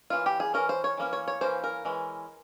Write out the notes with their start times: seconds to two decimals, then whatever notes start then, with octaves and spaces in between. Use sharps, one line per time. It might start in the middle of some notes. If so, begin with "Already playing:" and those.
0.10 E3 A#3 C#4 F4
0.26 G4
0.40 G#4
0.54 E3 A#3 C#4 A#4
0.69 C5
0.84 C#5
0.97 E3 A#3 C#4
1.13 C#5
1.28 C#5
1.41 E3 A#3 C#4 C5
1.64 A#4
1.85 E3 G#3 C#4